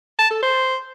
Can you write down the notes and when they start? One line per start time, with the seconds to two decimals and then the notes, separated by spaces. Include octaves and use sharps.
0.19 A5
0.31 A4
0.43 C5